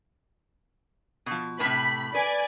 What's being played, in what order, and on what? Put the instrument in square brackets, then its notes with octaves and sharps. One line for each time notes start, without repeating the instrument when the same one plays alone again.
[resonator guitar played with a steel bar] B2 F3
[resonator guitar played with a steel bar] A2 C3 [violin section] B5
[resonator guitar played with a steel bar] B4 [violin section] D5 G#5